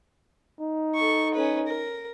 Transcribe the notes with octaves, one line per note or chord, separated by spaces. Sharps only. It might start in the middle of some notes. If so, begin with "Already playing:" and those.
D#4
A4 C#6
C#4 B4
A#4